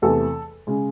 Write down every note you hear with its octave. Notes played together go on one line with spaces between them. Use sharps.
E2 C3 E3 A3 A4
C#3 G#3